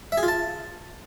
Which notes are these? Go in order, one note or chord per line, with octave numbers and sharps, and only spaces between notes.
E5
G#4
F4
A5